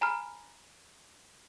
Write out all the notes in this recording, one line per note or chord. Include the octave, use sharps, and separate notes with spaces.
G#5 A#5 B5 F6